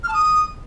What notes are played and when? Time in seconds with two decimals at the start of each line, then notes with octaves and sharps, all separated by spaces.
0.04 F6
0.09 A5
0.14 D#6